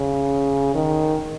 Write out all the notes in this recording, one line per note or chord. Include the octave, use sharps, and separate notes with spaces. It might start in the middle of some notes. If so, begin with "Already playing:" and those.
Already playing: C#3
D#3